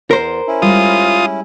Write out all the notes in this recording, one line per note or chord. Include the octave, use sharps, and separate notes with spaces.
E2 A#4 C5
C#4 E4
G3 G#3 F4 D#6
F6